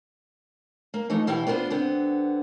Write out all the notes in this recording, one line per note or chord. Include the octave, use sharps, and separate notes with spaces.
A#3
E3 F3 A3 D#4
B2 E3 E4 G4 F5 G5
B3 D4 F4 A#4 C5
D3 B3 C4